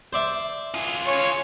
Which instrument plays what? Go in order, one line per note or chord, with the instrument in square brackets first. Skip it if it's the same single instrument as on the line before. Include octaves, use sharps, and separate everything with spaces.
[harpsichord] C5 D5 E5
[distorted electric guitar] F4 G#4
[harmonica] C#5 G#5 C#6